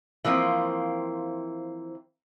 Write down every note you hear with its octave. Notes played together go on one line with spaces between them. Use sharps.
E3 F3 A#3 C4